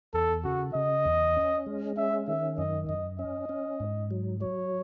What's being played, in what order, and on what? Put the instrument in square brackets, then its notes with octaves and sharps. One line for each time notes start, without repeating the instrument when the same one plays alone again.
[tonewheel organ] E2 [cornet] A4
[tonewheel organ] C#3 [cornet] F#4
[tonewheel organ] C#3 [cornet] D#5
[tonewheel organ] E2
C#4
G#3
[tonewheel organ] C#4 [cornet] E5
[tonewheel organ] D#3 [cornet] E5
[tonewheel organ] F#2 [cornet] D#5
[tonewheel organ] F#2 [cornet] D#5
[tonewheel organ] C#4 [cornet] D#5
[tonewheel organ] C#4
G#2
F#3
[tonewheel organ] F#3 [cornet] C#5